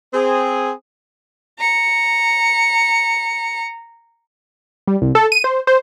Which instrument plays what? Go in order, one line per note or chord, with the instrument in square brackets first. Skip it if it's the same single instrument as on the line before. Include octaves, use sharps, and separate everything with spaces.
[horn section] C4 G#4
[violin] A#5 C#7
[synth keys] G3
C2
A4
D#7
C5
C5